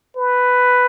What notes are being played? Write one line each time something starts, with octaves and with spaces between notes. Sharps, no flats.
B4